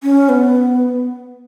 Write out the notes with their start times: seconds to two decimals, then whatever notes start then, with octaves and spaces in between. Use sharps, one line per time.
0.03 C#4
0.29 B3